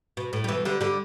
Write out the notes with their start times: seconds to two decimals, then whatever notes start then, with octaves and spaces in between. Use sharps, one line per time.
0.17 B2
0.33 A2
0.44 G3
0.48 B2 E3
0.65 D3 G3
0.81 D3 G3